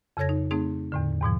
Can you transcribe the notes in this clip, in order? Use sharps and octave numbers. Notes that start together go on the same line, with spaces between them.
F2 C#3 A4 C#5 G#6 A#6
D#4
A3 C4 D#4 G#4
E2 A2 D3
E2 G#2 B2 F3